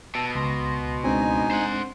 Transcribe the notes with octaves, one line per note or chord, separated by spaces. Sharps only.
B2 A5 E6
C#2 C6 A#6
G#3 C4 D4 D#4 G#5
C5 F#5